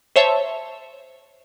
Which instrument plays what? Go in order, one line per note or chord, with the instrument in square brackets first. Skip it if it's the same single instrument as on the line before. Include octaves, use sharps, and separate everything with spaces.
[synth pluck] C5 C#5 E5 A5